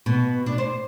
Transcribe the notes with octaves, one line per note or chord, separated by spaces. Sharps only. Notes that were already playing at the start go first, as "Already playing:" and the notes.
B2
D4
C5